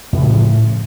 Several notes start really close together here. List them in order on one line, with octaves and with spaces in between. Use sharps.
A2 C#3 F#3 F3